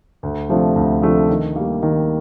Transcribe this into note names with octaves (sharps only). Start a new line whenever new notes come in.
D2
C3 F3 A3 D4
D2
C3 F3 A3 D4
D#3
G3 A#3
D#3